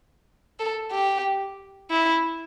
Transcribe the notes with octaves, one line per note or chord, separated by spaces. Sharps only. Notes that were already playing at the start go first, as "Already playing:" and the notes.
A4
G4
E4